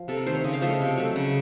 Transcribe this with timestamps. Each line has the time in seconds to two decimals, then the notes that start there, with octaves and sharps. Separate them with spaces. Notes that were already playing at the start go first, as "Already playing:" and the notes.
Already playing: F3
0.08 C3 A4
0.17 A#4
0.26 D#3 A3 C5
0.35 C#5
0.44 C#3 D#5
0.53 F5
0.62 F3 A3 D#5
0.71 C#5
0.80 C3
0.97 F#3 A3
1.16 C#3